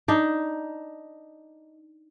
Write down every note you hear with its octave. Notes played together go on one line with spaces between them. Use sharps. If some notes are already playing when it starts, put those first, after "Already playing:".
D4 D#4